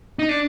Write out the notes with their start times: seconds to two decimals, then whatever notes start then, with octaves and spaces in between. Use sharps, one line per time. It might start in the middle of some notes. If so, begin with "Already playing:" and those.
0.19 D#4
0.29 D4